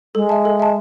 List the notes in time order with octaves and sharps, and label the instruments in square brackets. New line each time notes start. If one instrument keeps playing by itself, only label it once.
[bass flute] G#3 [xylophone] A4
[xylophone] E5 A5
A4
E5 A5